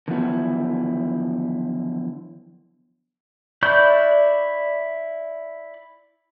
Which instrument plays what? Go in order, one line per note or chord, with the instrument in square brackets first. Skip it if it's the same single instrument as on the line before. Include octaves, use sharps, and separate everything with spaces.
[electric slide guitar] D3 D#3 F3 F#3 B3 E4
[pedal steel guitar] E4 D5 C#6 F#6 G6